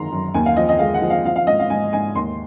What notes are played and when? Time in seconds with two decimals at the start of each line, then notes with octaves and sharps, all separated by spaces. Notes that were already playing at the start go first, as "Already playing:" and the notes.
Already playing: F#2 D#3 G#3 A#5 C6
0.12 F#2
0.34 D#2 G#5
0.46 F5
0.57 F3 D#5
0.69 D#5
0.79 G#3 F5
0.94 F#5
1.02 F3
1.10 F5
1.25 F3 F5
1.36 F5
1.47 G#2 D#5
1.60 F5
1.70 G#2 G#5
1.93 G#2 G#5
2.15 D#2 C6